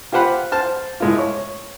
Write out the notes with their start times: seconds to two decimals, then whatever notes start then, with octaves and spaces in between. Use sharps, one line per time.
0.12 F4 G4 C5 F#5 B5
0.52 C5 A5 F6
1.00 A2 G#3 F4
1.18 C#5